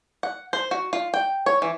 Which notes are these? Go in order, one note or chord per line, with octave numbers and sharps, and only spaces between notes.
F#5
C5
F#4
F4
G5
C#5
E3